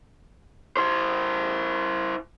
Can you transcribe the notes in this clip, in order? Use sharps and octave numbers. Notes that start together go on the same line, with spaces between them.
E4 C5